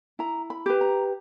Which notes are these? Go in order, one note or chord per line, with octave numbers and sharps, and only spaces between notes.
E4 A#5
B5
G4 B4
A#5